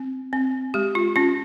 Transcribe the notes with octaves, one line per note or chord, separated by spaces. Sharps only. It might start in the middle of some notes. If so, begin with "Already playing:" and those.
Already playing: C4
C4
G#3 G4
F4
C#4 F4